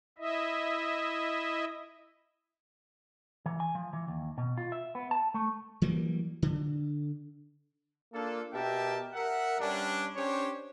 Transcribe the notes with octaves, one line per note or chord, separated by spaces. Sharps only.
E4 D#5 E5
E3
G#5
F3
E3
D#2
B2
F4
E5
B3
A5
A3
E3 F#3 G3 A#3
D3
A#3 D4 F4 A4
B2 G4 A#4 E5 G5 A5
A#4 E5 F#5
G2 G3 C#4 D4
C#4 D4 G4 C5 C#5